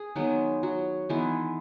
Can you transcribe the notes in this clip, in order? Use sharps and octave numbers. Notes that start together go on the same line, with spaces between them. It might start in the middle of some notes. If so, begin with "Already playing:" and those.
Already playing: G#4
D#3 F#3 G#3 B3 F#4
F#3 F#4
D#3 E3 G#3 B3 E4